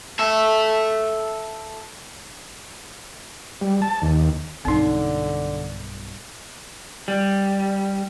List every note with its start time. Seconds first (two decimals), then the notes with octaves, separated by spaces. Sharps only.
0.19 A4 E5
3.61 G3
3.82 A5
4.02 D#2
4.65 B1 G2 D3 C4 D#4
7.08 G3